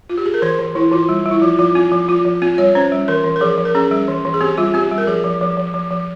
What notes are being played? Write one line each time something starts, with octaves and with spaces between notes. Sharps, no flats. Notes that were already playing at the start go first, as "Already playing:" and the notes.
F4
G4
G#4
A#4
E3 C5
E3
E3 E4
E3 F4
G3
G3
E4
F3 F4
F3 F4
C4 F4
F3
F3 F4
F3
C4 F4
G3 C#5
C#4 C5
G3
E3 A#4
E3
A#4
F3 G#4
F3
A#4
C#4 G#4
G3 G#4
E3
E3
G#4
C4 G4
G3 F4
C4 G4
G3
A#4
F3 G#4
F3
F3
F3
F3
F3